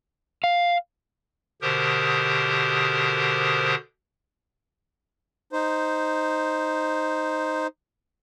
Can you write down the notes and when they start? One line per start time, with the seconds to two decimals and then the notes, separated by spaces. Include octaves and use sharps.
0.44 F5
1.62 B2 D3 G4 A#4 C5 D#6
5.53 D#4 C5